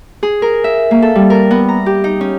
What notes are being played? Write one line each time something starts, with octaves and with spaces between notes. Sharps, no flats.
G#4
A#4
E5
A#3
A4
G3
A#4
B3
A#5
G4
D#4
C#4